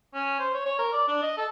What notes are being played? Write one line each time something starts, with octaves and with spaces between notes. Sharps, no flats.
C#4
C5
C#5
C#5
A#4
D5
D4
D#5
A4